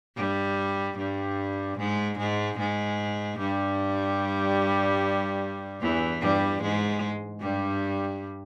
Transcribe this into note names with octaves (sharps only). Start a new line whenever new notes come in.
G2 G3
G2 G3
G#2 G#3
G#2 G#3
G#2 G#3
G2 G3
E2 E3
G2 G3
G#2 G#3
G2 G3